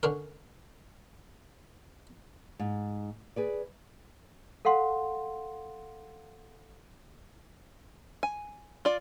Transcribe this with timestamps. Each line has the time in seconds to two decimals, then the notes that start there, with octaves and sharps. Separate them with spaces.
0.03 D3 C#4 A#4
2.59 G#2
3.36 G#4 B4 D5
4.65 A4 F5 F#5 C6
8.23 G#5
8.85 F4 D5